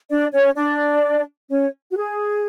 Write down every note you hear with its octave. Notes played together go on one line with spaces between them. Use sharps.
D4 D5
C#4 C#5
D4 D5
C#4 C#5
F#4
G#4